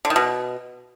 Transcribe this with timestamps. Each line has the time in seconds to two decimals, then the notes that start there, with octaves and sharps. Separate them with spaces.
0.05 D3
0.10 D#3
0.16 B2